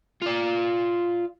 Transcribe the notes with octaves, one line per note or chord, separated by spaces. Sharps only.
F4 D5